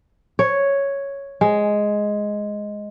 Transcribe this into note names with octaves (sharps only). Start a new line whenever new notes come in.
C#5
G#3